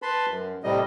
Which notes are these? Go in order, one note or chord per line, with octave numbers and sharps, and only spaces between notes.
B4 A5 B5 C6
F#2
A2 C3 G3 D#5